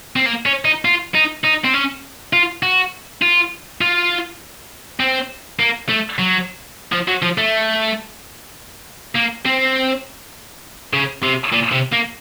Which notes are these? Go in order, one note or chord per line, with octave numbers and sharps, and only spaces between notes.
C4
A#3
C#4
D#4
F4
D#4
D#4
C4
C#4
F4
F#4
F4
F4
C4
A#3
A3
F#3
F3
F#3
F3
A3
A#3
C4
C#3
C3
A#2
C3
A#3